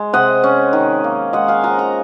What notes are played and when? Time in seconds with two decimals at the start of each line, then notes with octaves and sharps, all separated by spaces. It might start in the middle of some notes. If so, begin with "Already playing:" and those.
Already playing: G#3
0.13 C3 D#5 F#5
0.44 C#4
0.73 D#3
1.04 A#3
1.33 G#3 D#5 F#5
1.48 F5 G#5
1.64 F3 F#5 A#5
1.79 F#5 A#5